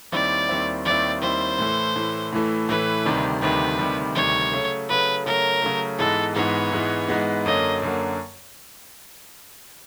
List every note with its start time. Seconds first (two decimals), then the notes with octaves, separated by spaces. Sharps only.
0.12 D#2 D#3 G3 C4 E4 D5
0.49 D#2 D#3 G3 C4 E4
0.85 D#2 D#3 G3 C4 E4 D5
1.22 D#2 D#3 G3 C4 E4 C5
1.59 A2 E3 A3
1.95 A2 E3 A3
2.33 A2 E3 A3
2.69 A2 E3 A3 B4
3.05 D2 C3 D#3 G3
3.42 D2 C3 D#3 G3 B4
3.79 D2 C3 D#3 G3
4.15 D2 C3 D#3 G3 C#5
4.52 C#3 F#3 A3
4.89 C#3 F#3 A3 B4
5.26 C#3 F#3 A3 A#4
5.62 C#3 F#3 A3
5.98 G#2 E3 G#3 B3 A4
6.36 G#2 E3 G#3 B3 C#5
6.72 G#2 E3 G#3 B3
7.08 G#2 E3 G#3 B3
7.46 F#2 D3 F#3 A#3 D#5
7.82 F#2 D3 F#3 A#3